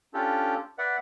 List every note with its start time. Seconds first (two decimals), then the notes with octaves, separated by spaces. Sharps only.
0.14 C#4 D4 F4 G4 A4
0.78 B4 D5 E5 F#5